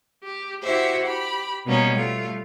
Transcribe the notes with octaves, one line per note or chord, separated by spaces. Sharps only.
G4
E4 F#4 G4 C5 E5
G4 B5
B2 G3 A#3 B3 C#4 D#4
G3 A3 F4